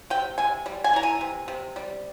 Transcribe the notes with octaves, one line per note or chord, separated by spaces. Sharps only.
C3 G5
C3 G#5
G3
G#5
E3 A#5
G#5
C3
C3
G3